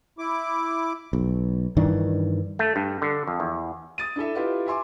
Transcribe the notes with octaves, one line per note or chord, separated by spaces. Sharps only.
E4 D6
B1
G2 D#3 E3 D4
A3
G2
D3
F2
E2
D#6 A6 D#7
D4 E4 A4 E5
E4 F4 G4 B4 D#5
E5 G#5 C6 D6